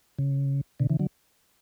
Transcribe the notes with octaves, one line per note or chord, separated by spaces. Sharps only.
C#3
B2 D3
C#3 E3
D3 F#3